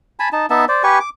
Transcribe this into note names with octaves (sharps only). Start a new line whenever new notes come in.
G#5 A5 B5
D#4 A5
B3 D#4 E5 A5
C5 D5
G4 B4 G#5 C#6
D6